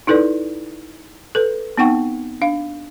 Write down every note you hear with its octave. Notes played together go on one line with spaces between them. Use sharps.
D#4 E4 A4 B4 D5
A4 B4
B3 C4 D#4 F#5 G5 C#6
D4 F5